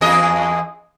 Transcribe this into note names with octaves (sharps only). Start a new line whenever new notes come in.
E2 G#4 D#5